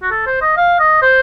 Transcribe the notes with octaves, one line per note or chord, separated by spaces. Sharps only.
F#4
A4
C5
D#5
F5
D#5
C5